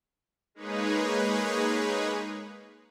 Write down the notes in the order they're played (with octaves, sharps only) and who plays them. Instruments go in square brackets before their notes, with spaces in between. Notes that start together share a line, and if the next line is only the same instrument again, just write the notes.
[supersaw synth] G#3 A#3 D#4 G#4 B4 C#5